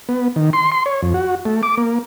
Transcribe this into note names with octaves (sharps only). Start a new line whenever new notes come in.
B3
D#3
C6
C6
C#5
F2
F#4
A3
D6
A#3